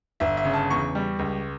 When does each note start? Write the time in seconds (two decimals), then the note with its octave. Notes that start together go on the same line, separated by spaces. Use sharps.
0.20 G1 E5
0.37 E5
0.45 C#3
0.53 A5
0.70 E2 C#6
0.95 G3
1.19 C#2